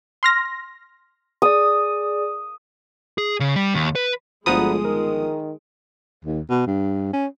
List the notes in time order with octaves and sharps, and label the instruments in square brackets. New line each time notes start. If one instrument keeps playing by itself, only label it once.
[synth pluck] C6 F6 A#6
[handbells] G#4 D5 [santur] D#6
[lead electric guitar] G#4
C#3
G3
D#2
B4
[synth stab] G1 F3 D#6 [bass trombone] D2 [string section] G#3 [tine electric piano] F#5 A#5 B5
[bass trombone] D#3 [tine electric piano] A#4
[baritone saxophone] D#2
B2
G2
C#4